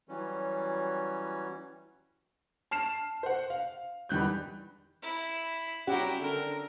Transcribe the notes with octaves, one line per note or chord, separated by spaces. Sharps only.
E3 F#3 G3 C#4
A5 F6 C7 E7
C5 F#5
F5
E2 D#3 G3 F#6 G6
E4 B5
C#4 E4 F#4 G4 F#5 G5 A#5
D3 A#4